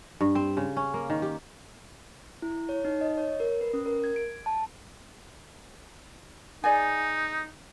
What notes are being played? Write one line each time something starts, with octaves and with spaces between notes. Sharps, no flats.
G2
C4
C#3
C#4
A#3
D#3
G4
E4
C#5
D#4
D#5
C#5
A#4
B4
C#4
A#4
G#6
D7
A5
D#4 G#4 D5 G#5